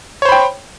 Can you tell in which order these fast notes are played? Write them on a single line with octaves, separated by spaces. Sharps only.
C#5 C5 B5 G5